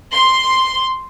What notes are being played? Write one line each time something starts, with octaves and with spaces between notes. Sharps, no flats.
C6